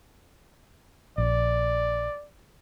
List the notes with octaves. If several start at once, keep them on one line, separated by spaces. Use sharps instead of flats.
A#1 D5